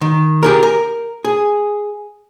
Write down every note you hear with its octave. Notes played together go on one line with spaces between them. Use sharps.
D#3
G4 G#4 A#4
A#4
G#4